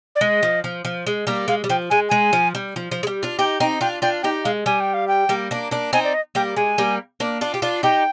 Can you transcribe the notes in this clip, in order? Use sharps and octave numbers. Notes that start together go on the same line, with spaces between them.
D5
G#3 D#5
F3
F3
F3
G#3
G3 A#3
G#3 F5
G3
F3 G5
G#3 G#5
G#3 G#5
F3
G3
F3
F3
G#3
G3
D4 F4
D#4 G4 G5
C4 D#4 G5
D4 F4 G5
D4 F4 G5
D#4 G4 G5
G#3 F5
G3 G#5
G5
F5
G5
G3 A#3
A#3 D4
A#3 D4
C4 D#4 G#5
D5
D#5
G3 A#3 G5
G#3 G#5
G3 A#3
A#3 D4
D4 F4
G4
D4 F4
D#4 G4 G5